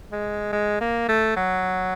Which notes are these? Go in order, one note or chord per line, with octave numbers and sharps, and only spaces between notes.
G#3
G#3
A#3
A3
F#3